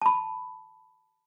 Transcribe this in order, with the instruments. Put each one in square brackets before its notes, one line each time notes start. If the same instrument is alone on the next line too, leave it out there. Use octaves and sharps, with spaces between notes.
[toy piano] A5 B5